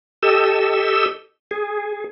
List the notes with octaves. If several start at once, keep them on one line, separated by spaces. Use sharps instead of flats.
G4 A4 D#5 E6
G#4